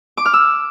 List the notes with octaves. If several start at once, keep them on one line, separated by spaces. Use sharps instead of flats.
D6
F6
E6